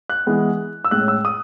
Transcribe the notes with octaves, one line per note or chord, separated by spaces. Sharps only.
F#6
E3 G#3 B3
E6
A2 G#3 C#4 F#6
E6
D#6